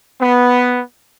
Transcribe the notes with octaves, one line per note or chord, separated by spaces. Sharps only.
B3